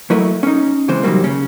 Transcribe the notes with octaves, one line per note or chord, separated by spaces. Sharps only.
F#3 A3 E4 A#4 D#5
C#4 D#4
C#3 E3 G#3 C4 C5
C2 F#2 D#3 F#3 G3 A#3
C#3 C#4